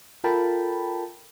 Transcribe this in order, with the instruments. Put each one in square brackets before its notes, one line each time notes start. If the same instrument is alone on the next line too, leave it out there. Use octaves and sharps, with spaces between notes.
[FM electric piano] F4 A4 A#4 G5 A5 B5